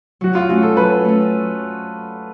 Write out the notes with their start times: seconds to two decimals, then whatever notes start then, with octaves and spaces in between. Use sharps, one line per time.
0.21 F#3 F#4
0.35 F4
0.49 A3 C#4 F#4
0.63 A4
0.77 F#3 B4
1.05 A3 C#4